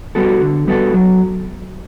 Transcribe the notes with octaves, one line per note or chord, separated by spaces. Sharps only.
G3 B3 F#4 A4
D3
G3 B3 F#4 A4
F#3